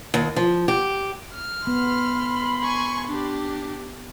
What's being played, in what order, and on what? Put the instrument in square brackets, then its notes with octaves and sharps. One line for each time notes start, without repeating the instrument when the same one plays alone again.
[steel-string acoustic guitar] D#2
F3
G4
[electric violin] F6
[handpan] B3 [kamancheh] B5 C6
[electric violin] G#5 C#6
D4 G4